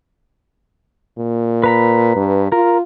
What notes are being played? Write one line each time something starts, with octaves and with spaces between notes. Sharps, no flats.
A#2
B4 A#5 B5
G2
F4 A#4